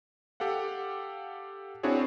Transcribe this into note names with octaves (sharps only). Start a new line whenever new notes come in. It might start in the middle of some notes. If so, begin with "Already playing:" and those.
G4 A4 F5 F#5
C4 D4 E4 F#4 G#4 C#5